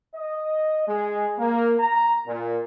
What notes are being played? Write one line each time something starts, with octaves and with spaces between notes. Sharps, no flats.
D#5
G#3
A#3
A#5
A#2